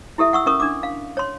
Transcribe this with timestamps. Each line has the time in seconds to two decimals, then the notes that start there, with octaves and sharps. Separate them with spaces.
0.18 E4 G4 A4 E5
0.33 F#5 C#6 E6
0.46 C#4 A#4 C#6 D#6
0.60 D4 D6
0.83 F5
1.17 C#5 C6